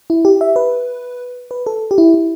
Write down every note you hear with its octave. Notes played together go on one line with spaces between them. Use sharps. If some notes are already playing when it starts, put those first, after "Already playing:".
E4
G4
E5
B4
B4
A4
G4
E4
E4